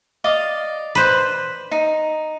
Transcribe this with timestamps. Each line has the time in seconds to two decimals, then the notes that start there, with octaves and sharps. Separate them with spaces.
0.24 D5 D#5 F5
0.95 B4 C5
1.71 D#4